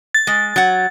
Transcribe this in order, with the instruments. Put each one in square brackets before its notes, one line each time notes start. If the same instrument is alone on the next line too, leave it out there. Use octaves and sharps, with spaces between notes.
[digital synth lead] A6
[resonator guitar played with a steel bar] G#3
F#3 F#5